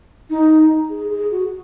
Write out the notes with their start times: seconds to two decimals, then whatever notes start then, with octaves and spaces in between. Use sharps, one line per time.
0.30 D#4
0.90 G#4
1.10 G#4
1.31 F#4